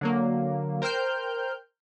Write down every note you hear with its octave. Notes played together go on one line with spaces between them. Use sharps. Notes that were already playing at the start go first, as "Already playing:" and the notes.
D3 F#3 A#3
A#4 C5 G5 F6 G6